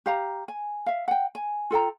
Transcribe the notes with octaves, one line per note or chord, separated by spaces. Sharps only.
G4 F5 A#5
G#5
E5 F5
F#5 G5
G#5
F4 A4 G5 A#5